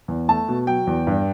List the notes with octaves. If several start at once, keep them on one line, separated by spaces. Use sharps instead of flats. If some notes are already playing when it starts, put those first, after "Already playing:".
E2
A3 A5
B2
F#3 G5
E2
G2